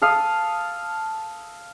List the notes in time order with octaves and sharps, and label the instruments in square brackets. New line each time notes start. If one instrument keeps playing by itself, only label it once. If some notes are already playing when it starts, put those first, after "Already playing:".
[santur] A4 F5 D#6